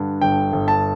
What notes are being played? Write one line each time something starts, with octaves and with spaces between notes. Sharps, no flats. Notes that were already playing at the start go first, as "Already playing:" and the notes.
Already playing: G2 D3
G1 G5
G1
A5